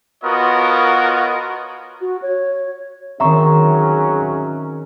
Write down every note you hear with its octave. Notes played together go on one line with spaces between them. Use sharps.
B3 F4 F#4 A#4 C#5 D#5
F#4
C#5
D#3 F#3 C4 C#4 G#4 E5 A#5 C#6